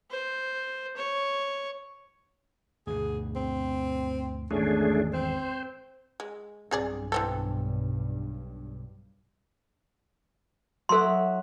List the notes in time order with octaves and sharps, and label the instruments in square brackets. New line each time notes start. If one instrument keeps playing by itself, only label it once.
[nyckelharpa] C5
C#5
[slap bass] D2 G2 B2 [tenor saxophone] G#4
[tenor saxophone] C4
[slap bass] G#1 E2 E3 [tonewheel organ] A3 D4 G#4 [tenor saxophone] C#4
[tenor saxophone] C4 [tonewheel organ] C5
[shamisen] G#3
[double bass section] B1 G2 [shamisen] C4 G#4 D5
[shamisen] E3 C4 A4
[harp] F#3 E4 F#5 [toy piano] A4 C6